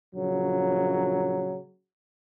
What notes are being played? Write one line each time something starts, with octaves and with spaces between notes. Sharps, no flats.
A#1 C#3 F#3